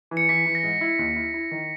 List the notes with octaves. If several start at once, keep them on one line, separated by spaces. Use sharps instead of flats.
E3
C#7
E3 B6
E3
A#6
G#2
E4
D#2
E4
E4
D#3